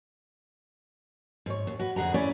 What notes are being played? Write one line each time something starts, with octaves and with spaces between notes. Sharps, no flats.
G#2 C#5
D#2
F#4 B4
F2 D3 G#4 F#5 A#5
C#4 E4 B4 C#5 D5